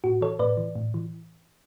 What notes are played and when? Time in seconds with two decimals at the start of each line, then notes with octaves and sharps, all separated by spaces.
0.04 A2 F#4
0.21 E3 A4 C#5
0.39 A2 B4 D5
0.57 E3
0.75 A2
0.94 E3